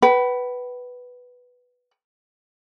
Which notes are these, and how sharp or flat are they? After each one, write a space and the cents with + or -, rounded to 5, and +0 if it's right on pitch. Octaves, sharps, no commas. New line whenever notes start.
B4 +0 F#5 +45